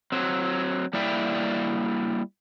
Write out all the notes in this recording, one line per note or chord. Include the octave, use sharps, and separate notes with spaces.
F#3 C4
G3 A#3 E4 D5 E5 G5